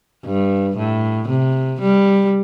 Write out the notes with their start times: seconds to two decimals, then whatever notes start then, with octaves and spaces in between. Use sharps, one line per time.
0.25 G2
0.76 A2
1.29 C3
1.81 G3